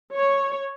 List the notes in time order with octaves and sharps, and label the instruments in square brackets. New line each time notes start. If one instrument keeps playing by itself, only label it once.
[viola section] C#5